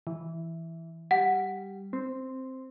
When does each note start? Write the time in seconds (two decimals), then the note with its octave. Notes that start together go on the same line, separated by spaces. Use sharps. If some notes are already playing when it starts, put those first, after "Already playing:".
0.07 E3
1.11 G3 F#5
1.93 C4